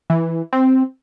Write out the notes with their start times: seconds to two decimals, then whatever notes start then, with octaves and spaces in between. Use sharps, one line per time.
0.10 E3
0.53 C4